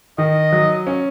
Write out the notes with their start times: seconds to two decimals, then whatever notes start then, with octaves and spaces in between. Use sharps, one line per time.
0.18 D#3 D#5
0.53 F#3
0.87 C#4